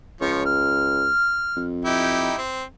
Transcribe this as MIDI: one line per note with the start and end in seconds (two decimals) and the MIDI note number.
0.21 1.10 37
0.21 0.42 53
0.21 0.42 73
0.45 1.63 89
1.56 2.30 41
1.85 2.38 63
1.85 2.38 64
1.85 2.38 67
2.38 2.64 60